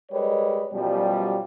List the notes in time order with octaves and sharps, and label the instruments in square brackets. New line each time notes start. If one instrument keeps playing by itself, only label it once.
[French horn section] G3 G#3 A#4 B4 C#5 D#5
F#2 B2 F3 G3